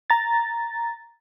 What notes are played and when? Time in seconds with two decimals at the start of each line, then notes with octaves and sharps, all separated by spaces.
0.10 A#5 A6